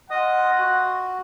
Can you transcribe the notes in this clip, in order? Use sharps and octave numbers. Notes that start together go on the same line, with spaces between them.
F4 D#5 F#5 D#6
F#4